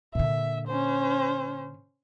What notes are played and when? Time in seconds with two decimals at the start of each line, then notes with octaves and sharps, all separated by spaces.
0.15 A#2 D3 E5
0.68 C#4 C5